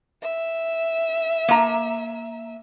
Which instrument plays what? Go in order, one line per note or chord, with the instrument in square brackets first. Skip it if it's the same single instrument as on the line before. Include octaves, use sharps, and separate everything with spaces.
[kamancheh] E5
[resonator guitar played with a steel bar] A#3 A#5